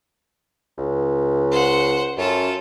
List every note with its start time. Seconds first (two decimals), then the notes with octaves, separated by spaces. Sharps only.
0.78 C#2
1.52 C5 F#5
2.17 F#2 F4 A4